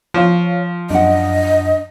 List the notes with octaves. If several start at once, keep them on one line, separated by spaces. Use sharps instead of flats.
F3 F4 C#5 F5
F#2 D4 D#5 F#5